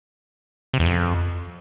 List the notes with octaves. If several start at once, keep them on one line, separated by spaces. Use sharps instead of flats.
C3
E2
F2